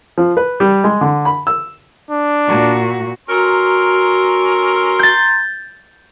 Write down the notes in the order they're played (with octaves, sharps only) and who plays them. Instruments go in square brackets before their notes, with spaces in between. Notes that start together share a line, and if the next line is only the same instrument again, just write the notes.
[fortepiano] F3
B4
G3
G#3
D3
B5
E6
[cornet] D4
[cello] A#2 F#4
[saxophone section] C#4 A4 A#4 [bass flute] F#4 [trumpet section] A#5 C6
[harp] G6 A6